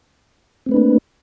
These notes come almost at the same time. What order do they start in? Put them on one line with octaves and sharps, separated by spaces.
C4 A3 B4 D4 A#3